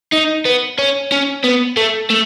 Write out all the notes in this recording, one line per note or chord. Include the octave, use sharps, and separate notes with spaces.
D#4
B3
C#4
C#4
B3
A3
A3